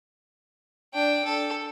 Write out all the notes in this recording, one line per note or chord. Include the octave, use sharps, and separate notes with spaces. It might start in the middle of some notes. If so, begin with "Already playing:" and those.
D4 G5
A4